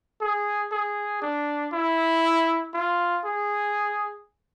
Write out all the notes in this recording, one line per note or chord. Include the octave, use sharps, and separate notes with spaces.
G#4
G#4
D4
E4
F4
G#4